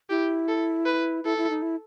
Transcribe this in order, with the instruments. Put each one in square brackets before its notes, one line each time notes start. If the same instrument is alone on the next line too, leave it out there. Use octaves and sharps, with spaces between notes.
[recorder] E4 [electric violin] G4
[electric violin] A4
B4
[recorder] E4 [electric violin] A4
[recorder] E4
D#4
E4